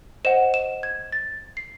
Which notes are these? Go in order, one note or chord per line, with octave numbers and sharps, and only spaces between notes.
C5 D#5 F#5 E7
E7
G#6
A6
C7